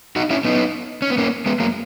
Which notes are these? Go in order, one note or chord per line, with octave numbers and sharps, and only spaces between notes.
D#4 F#4
C#4 E4
B3 D#4
C#4
B3
A#3 C#4
G#3 B3
F#3 A#3